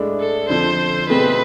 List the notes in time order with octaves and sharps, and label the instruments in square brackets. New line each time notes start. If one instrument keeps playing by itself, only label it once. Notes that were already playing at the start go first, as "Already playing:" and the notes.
Already playing: [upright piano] A2 G#3 D4
[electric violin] A4
[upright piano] F2 D3 F3 [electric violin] C5
[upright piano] B2 A3 C4 G#4 [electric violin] B4